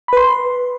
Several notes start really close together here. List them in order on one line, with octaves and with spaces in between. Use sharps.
B5 B4 C6